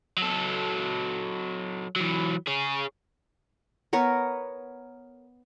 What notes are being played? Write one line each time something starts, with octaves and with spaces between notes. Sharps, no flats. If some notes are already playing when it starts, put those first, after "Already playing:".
F#3 A4
E3 F#3
G#4 C#5
B3 A#4 C#5